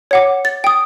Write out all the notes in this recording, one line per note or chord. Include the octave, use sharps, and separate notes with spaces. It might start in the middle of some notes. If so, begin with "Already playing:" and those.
C#5 F#5 D6
A6
G5 D#6